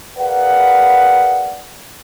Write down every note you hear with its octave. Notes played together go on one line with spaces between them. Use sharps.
G#4 A#4 B4 D5 F5 F#5